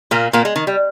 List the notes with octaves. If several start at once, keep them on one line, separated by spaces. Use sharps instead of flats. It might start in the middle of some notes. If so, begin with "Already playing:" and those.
A#2 A#3
A#2 A#3
G#3
D#3
G3